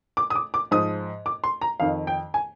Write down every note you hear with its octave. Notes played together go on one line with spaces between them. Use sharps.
D6
D#6
D6
D6
G#2 F3 D#6
D6
C6
A#5
F2 D#3 F5
G5
G#5